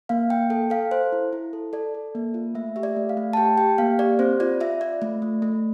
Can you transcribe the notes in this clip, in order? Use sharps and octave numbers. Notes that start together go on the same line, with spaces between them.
A#3 F5
A#3 G5
A4 G5
A4 F5
A4 C5
E4
E4
A4
A4 D5
A4
A#3
F4
A3 E5
G4 E5
D5
A3
F5
A3
A5
G4 G5
G4 G5
A#3 F5
G4 D5
C4 C5
F4 D5
F4 E5
F4 D5
A3
A3
A3